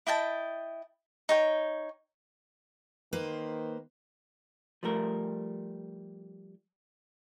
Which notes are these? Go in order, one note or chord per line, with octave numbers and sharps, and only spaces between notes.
E4 D#5 G5 A5
D#4 C#5 G5
D#3 A#3 B4 C5
F3 G3 A3 A#4